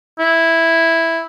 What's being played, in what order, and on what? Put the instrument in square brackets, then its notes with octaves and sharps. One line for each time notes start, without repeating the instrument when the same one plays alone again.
[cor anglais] E4